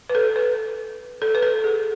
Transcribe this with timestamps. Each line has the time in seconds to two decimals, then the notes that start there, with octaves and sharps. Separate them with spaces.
0.10 B4
0.15 A4
0.36 B4
1.22 A4
1.35 B4
1.42 A4
1.64 G#4